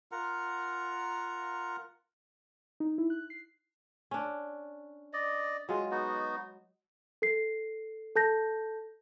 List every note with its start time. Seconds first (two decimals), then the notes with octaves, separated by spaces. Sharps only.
0.12 F4 A#4 F#5 A#5
2.80 D#4
2.98 E4
3.10 F#6
3.30 C7
4.11 C#4 D4
5.13 D5 D#5
5.69 F#3 G#3 F4
5.91 B3 D#4 F#4
7.22 A4 C7
8.16 A4 A5 G6 A#6